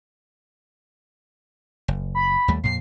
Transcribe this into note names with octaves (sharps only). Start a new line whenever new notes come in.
F#1
B5
D#2 G3 A3
F2 A#2 C7